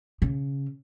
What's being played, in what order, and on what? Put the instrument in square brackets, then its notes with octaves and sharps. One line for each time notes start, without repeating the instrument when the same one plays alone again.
[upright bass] C#3